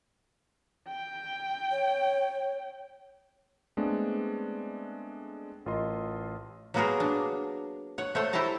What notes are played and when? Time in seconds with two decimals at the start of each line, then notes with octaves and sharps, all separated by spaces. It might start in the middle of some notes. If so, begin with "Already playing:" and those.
0.88 G5
1.71 C#5
3.77 G#3 A3 B3 C4 D4
5.66 A1 F4 A#4 D#5 C6
6.74 F#3 A#3 B3 F#4 G#4 A#4
7.00 D4
7.98 C#5 F#5
8.15 A3 C5 C#5 F#5 A5
8.33 E4 G4 C5 A5 A#5